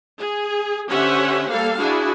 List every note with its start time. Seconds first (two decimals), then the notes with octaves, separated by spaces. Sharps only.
0.18 G#4
0.90 D3 C#4 G4 C5 E5 F#5
1.50 G3 A#3 A4 F5
1.79 D4 E4 F#4 G#4